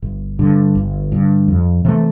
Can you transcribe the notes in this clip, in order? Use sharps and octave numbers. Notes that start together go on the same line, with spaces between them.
G1
G2 D3
G1
G2 D3
F2
C3 E3 A3